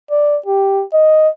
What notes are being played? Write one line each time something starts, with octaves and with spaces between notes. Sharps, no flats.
D5
G4
D#5